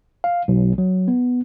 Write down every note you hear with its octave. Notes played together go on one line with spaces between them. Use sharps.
F5
B1
F#3
B3